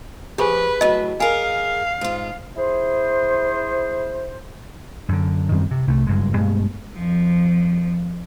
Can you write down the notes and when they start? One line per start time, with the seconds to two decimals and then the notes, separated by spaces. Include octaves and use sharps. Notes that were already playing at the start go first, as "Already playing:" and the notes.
0.38 F3 G4 G#4 B4 G#5
0.81 A2 F#3 D#5 A5
1.20 G#4 A#4 F5 G#5
2.01 G#2 F4
2.57 E4 G#4 C5
5.09 F#2 D3
5.51 F#2 D#3 G3 C4
5.71 C3
5.87 C2 C3 A3
6.07 F#1 G2 G#3
6.34 G2 B2 G#3 A3
6.94 F2 F3